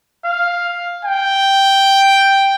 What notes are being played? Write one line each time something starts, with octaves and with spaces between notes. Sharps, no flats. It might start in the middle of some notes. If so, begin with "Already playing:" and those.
F5
G5